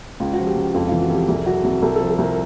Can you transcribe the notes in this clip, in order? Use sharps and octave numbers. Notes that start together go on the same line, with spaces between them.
C#2 F4
F#4
F3
G4
C#2
F2 F4
E3 F4
F#4
F2 G4
C2 G#4
F#3 F#4
C2
C2 A4
F3 A4
A4
C2 A#4